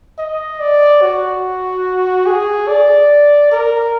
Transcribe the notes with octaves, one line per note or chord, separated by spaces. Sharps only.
D#5
D5
F#4
G#4
D5
A#4